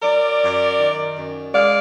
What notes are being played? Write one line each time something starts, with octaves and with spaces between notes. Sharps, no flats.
F#3 A#4 D5
F#2
D#3
F#2
G#3 D5 F5